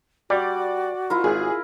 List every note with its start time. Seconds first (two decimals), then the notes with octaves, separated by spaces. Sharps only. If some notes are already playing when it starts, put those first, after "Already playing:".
0.30 G3 F#4 D5
1.10 E4 F4 A#4
1.24 G#1 G#4